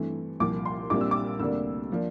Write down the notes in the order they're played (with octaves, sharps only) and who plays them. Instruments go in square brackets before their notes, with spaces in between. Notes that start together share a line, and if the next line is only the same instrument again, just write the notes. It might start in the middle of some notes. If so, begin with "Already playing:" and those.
Already playing: [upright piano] G2 E3 A3 C4
C2 A#2 F3 D6
C6
A#1 A#2 G3 C4 D6
E6
D6
D2 C3 G3 A#3 D4 E6
F3 A#3 D4